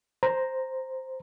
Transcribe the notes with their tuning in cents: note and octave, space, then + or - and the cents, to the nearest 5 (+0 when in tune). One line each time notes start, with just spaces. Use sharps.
C5 +0 A#5 +0